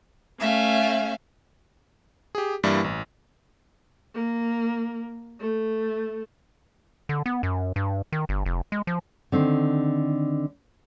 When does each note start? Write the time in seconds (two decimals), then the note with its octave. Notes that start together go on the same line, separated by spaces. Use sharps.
0.40 A3 C#4 E5 F5
2.35 G4 G#4
2.64 G2 E3 G3 A#3 E4
2.84 A1
4.15 A#3
5.41 A3
7.09 D3
7.26 B3
7.43 F#2
7.76 G2
8.12 D#3
8.29 G1
8.46 F1
8.72 G#3
8.87 F3
9.32 D3 D#3 C4